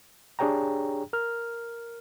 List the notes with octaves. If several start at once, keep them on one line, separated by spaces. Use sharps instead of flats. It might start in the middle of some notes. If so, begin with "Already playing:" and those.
D4 G4 G#4 C#5 G5 A#5
A#4 F6